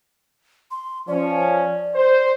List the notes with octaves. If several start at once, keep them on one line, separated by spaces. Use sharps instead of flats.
C6
F3 C#4 D5
C5